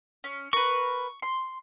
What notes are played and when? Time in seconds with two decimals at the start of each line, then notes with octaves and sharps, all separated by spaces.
0.24 C#4
0.53 A#4 B4 C#6
1.22 C6